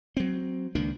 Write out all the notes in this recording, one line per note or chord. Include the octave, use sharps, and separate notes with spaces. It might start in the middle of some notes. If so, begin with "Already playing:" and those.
F#3 C4
C#2 D#3 A#3 D4